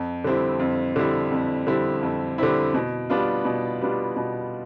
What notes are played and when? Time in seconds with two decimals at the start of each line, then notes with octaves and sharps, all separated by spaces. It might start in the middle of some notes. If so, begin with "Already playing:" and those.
Already playing: F2
0.24 D3 G3 C4 E4
0.59 F2
0.96 D3 G3 C4 E4
1.31 F2
1.67 D3 G3 C4 E4
2.03 F2
2.38 D3 G3 C4 E4
2.74 B2
3.10 G3 B3 D4 F4
3.45 B2
3.81 G3 B3 D4 F4
4.16 B2